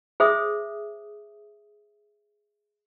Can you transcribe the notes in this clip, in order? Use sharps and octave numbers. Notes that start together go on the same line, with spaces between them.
G#4 C5 E5 D#6